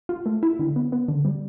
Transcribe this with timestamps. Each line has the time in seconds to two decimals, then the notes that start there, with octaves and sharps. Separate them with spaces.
0.09 F4
0.26 A3
0.43 E4
0.59 D3
0.76 B3
0.92 B3
1.08 D3
1.25 G3